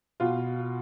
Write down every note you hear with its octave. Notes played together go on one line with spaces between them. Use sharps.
B2 F4